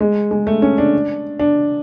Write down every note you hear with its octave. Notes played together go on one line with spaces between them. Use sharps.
G#3
G#3
A3
C#4
D4
D4